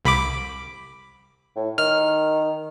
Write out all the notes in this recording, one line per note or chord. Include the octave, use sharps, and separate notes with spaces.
C2 B5 D6
A2
D#3 F6